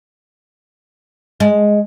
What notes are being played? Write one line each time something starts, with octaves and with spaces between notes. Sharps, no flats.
G#3